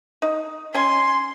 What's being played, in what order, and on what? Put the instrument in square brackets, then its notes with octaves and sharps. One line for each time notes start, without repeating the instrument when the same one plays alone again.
[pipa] D#4
[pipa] C#4 G#5 [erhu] C6